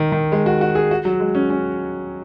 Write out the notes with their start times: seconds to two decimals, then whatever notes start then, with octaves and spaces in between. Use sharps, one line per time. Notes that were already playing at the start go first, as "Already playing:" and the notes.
Already playing: D#3
0.12 D#3
0.32 G#3
0.46 F#4
0.61 F#4
0.75 G#4
0.91 F#4
1.05 F#3
1.20 G#3
1.35 C#4
1.50 C#4